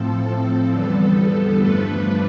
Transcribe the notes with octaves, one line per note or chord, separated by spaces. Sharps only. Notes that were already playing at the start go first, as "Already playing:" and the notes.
Already playing: A2 F3 C4 A4
E2 D3 G3 B3
G2 F3 A3 D4 B4